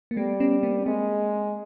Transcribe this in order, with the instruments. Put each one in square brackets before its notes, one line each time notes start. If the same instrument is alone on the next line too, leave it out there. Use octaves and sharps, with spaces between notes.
[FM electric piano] A#3
[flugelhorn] G3 [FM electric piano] A3 B3
[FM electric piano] B3 C#4
A#3 C4
[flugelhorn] G#3 [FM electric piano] A#3 C4